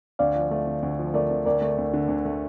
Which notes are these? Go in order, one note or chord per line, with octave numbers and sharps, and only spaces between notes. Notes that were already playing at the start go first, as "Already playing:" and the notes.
D2 D5 F5
F3
A3
D3
D2
F3
A3 A#4 D5
D3
D2 A#4 D5
A3
D2
D3
D2
A3